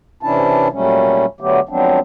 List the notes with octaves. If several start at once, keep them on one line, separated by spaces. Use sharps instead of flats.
C3 E3 C#4 D4 E4 A5
A#2 F#3 G3 A3 C#4
D3 F#3 A3 B3 G4
F3 F#3 G#3 B3 C4 D4